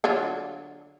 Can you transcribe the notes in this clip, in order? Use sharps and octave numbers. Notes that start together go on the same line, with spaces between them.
D3 F#3 F4